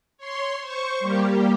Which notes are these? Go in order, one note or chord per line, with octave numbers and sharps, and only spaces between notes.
C#5 C6
C5 C#6
G3 A#3 G4